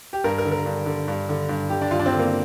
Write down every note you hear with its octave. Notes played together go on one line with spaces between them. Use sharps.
G4
G2 A#4
A#4
D3
A#4
G2
D3
G2
D3
G2
D3 G4
D4
G2 F4
D4
C4
D3
A#3